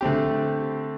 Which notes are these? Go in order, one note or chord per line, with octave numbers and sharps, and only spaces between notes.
D3 A3 C4 G4